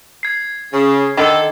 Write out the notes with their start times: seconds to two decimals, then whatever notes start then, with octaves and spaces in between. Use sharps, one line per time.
0.23 G#6 C7
0.73 C#3
1.17 D3 D#3 A4